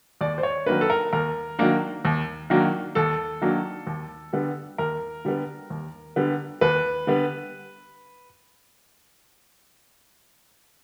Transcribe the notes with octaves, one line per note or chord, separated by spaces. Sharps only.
D#2 D5
C5
C#5
D#3 F#3 A#3 D4 B4
A4
A#4
D#2 A#4
D#3 F#3 A#3 D4
D#2
D#3 F#3 A#3 D4
D#2 A4
D#3 F#3 A#3 D4
D#2
D3 G3 B3
D#2 A#4
D3 G3 B3
D#2
D3 G3 B3
D#2 B4
D3 G3 B3